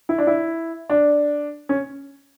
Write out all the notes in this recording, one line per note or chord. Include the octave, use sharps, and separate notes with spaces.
E4
D4
E4
D4
C#4